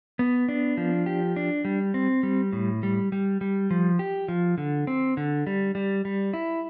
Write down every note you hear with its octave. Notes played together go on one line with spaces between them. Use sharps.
B3
D4
F3
G4
D4
G3
C4
G3
A2
G3
G3
G3
F3
G4
F3
D3
C4
D3
G3
G3
G3
E4